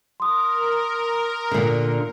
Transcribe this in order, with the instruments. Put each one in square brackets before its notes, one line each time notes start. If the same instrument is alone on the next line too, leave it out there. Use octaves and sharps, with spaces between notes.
[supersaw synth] A#4 [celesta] C6 D#6
[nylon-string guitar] A#2 D3